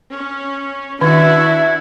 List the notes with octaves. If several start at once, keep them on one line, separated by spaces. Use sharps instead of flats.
C#4
D#3 D4 E4 F#4 E5 G#6